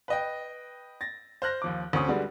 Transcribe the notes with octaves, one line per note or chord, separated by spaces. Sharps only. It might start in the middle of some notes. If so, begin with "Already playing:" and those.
B4 D#5 G5
A6 A#6
C5 F6 F#6 A#6
D#2 F3 D6
D2 C4 C#4 C#6 D#6
D3 G3 G#3 F#4 B4